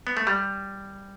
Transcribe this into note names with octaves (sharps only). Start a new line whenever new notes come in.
B3
A3
G3